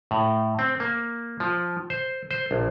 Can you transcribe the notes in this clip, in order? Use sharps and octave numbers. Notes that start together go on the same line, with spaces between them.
A2
C4
A#3
F3
C5
C5
A#1